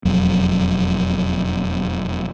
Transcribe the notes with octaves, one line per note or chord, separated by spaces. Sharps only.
E1 F2 F#3